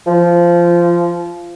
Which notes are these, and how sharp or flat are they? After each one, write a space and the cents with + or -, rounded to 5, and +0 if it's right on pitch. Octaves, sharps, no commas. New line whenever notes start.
F3 -15